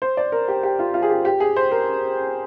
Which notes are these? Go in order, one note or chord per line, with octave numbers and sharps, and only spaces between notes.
C5
D5
A#4
G4
G4
F4
F4
G#4
G4
G4
G#4
C5
A#4